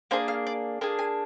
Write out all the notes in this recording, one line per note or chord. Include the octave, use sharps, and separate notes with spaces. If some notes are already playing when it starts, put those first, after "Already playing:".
A#3 D4 G#4 C5
F5
D5
A#3 D4 G#4
G#5